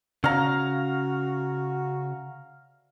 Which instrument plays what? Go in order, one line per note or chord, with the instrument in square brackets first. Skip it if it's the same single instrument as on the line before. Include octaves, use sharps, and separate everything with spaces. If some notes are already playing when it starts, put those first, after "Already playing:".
[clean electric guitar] C#3 [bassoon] F#4 [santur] F5 A#5